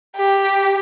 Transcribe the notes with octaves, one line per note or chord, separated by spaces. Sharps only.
G4